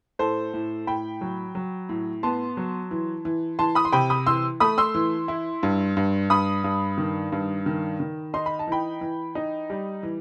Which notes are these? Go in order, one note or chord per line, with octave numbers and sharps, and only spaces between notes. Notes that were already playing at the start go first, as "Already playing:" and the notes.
A2 A4 C5
A2
A2 G5 B5
F#3
F#3
A2
B3 A5 C6
F#3
E3
E3
E3 A5 C6
B5 D#6
C6
C3 G5 B5
B5 D#6
E3 C6 E6
A3 B5 D#6
C6 E6
E3
E4
G2
G2
G2 B5 D#6
G2
D#3
G2
D#3
D#3
D#4 C6
B5
A5
E3 G5 B5
E3
D#4
G3
E3